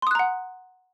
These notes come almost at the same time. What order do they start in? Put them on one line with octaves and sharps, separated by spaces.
C6 D#6 F#6 A#5 F#5